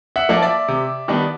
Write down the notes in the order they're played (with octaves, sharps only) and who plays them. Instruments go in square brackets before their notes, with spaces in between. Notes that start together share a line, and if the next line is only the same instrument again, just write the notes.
[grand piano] E5 F#5
F3 A#3 D4
D5 E5
C3
D#3 G3 B3 D4